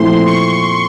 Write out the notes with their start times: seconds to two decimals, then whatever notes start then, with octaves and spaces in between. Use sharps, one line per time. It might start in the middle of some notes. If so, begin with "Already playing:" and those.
Already playing: A#2 F3 A3 C4 E4 C6
0.27 C#6